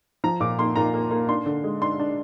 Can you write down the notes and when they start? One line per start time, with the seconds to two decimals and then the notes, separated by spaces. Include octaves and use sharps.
0.24 F3 A#5
0.40 A#2 D6
0.59 A#3 C6
0.76 A#2 A#5
0.94 A#3
1.11 A#3
1.28 D4 C6
1.46 D3
1.64 G#3
1.81 D4 C6
2.00 D4